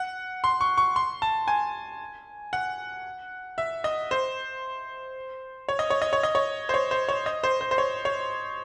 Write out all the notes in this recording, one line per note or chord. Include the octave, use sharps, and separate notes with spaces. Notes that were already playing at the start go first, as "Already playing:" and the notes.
Already playing: F#5
C6
C#6
C#6
C6
A5
G#5
F#5
E5
D#5
C5
C#5
D#5
C#5
D#5
C#5
D#5
C#5
C5
C#5
C5
C#5
D#5
C5
C5
C5
C#5
C#5